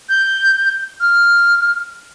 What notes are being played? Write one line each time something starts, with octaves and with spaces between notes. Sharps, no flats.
G6
F6